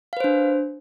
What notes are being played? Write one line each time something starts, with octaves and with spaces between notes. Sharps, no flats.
D4 B4 C5 F5